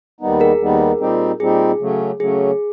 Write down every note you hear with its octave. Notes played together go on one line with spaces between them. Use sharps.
D#2 D#3 G3 B3 D#4
G#4 A#4
D#2 D#3 G3 B3 D#4
A#2 G3 C4 D#4 G4
A#2 G3 C4 D#4 G4 G#4
C#3 F#3 A3 C#4
C#3 F#3 A3 C#4 G#4